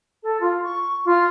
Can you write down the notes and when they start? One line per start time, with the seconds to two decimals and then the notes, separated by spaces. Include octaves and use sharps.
0.23 A4
0.40 F4
0.64 C#6
1.05 F4